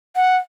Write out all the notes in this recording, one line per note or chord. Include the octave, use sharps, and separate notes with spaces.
F#5